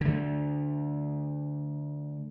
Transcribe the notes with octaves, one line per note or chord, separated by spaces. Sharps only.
D3 A3